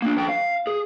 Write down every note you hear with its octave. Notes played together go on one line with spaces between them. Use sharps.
A#3 D4
F3 G5
F5
G#4